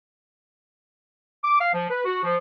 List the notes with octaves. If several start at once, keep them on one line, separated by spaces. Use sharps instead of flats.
D6
F5
F3
B4
F#4
F3